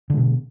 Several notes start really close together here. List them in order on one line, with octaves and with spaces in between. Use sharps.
D3 G#3 B2